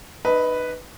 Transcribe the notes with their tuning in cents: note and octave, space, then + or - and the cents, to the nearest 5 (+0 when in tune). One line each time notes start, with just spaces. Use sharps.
D#4 -40 B4 +0 D#5 +30